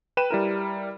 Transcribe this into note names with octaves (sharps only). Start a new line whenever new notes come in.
B4 G5 D#7 E7
G3 E4 A#4